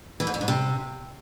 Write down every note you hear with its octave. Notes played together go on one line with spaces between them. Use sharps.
E3
G#2
F2
G#2
C3